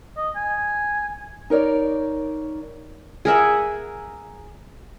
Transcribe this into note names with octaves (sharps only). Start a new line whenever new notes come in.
D#5
G#5
D#4 A#4 C#5 D5
G#4 A#4 E5 F#5